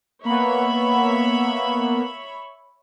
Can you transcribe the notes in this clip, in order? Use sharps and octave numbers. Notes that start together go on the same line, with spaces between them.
A#3 B3 C#5 E5 B5